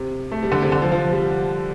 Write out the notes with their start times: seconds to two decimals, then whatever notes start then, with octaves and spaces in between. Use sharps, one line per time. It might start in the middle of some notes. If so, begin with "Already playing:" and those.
Already playing: C3
0.31 A3
0.43 G3
0.52 D3
0.62 C3
0.72 D3
0.82 F3
0.92 F3
1.12 G3